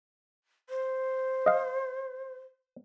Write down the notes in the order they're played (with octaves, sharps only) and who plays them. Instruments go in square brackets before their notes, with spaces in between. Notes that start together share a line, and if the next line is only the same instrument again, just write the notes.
[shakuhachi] C5
[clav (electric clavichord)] D#5 F5